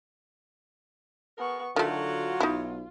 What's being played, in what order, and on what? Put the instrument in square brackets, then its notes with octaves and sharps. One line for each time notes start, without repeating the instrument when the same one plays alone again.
[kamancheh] B3 C#6 [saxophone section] G#4 A#4
[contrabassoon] D3 [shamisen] D#3 A3 [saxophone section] F#3 F#4 [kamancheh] F4
[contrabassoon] B1 [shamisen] D#4 E4